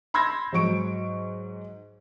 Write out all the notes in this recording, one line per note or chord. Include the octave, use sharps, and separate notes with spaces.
B5 C6 E6 G6 G#6 A#6
G#2 F#3 C#6 D7